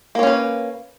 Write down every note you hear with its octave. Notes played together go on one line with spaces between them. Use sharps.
A#3 C#4 B4 C#5